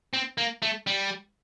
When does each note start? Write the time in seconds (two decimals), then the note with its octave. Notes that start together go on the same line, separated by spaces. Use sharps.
0.13 C4
0.38 A#3
0.62 A3
0.87 G3